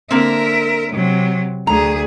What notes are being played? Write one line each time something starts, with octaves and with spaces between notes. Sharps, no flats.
D3 A#3 C4 A#4 E5
C3 F#3
D2 G#4 A#5